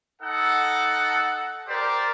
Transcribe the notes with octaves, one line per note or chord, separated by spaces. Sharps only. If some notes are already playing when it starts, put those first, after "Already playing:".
D#4 A4 F#5
G4 A#4 C5 D5